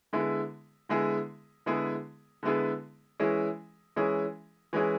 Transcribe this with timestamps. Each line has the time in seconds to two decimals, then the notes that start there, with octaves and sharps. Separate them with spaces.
0.13 D3 G#3 B3 E4 G#4
0.89 D3 G#3 B3 E4 G#4
1.66 D3 G#3 B3 E4 G#4
2.43 D3 G#3 B3 E4 G#4
3.20 E3 G#3 C#4 E4 G#4
3.96 E3 G#3 C#4 E4 G#4
4.73 E3 G#3 C#4 E4 G#4